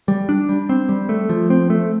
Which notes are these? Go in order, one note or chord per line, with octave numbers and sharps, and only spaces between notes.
G3
D4
G3
C4
G3
A3
F3
C4
A3